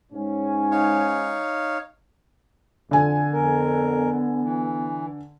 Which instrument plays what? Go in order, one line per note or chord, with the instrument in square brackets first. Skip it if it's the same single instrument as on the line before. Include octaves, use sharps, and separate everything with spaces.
[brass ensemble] G#2 C#4
[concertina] D#4 C#5 F5
[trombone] F2 [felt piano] D3 G#5
[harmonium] F2 A#4 [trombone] B3
[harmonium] E3